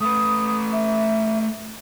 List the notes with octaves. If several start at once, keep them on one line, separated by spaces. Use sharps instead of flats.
A3 B4 D#6
E5